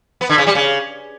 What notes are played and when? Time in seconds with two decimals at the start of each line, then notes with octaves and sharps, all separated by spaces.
0.21 B3
0.29 D3
0.38 C#3
0.47 G3
0.55 C#3